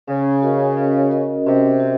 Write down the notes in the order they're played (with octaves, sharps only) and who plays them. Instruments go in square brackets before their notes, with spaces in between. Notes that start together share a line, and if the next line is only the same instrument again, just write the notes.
[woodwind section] C#3 [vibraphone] C#4
[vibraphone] F#4 A#4 D#5
C#4
F#4 A#4 D#5
[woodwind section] C3 [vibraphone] C#4
[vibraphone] F#4